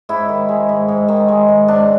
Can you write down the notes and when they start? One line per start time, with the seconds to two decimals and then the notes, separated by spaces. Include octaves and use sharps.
0.09 G#2 E4
0.29 D#3
0.49 G#3
0.69 G#2
0.88 G#2
1.08 D#3
1.28 G#3
1.48 G#2
1.68 G#2 D4